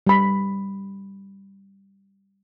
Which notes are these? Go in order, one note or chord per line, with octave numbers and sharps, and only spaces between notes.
G3 B5